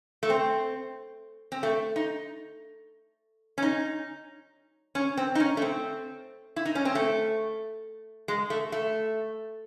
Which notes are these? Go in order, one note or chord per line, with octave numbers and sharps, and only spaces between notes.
A3
C4
C4
A3
D#4
C#4
D#4
C#4
C4
D#4
C#4
A3
C4
E4
D#4
C#4
C4
A3
G#3
A3
A3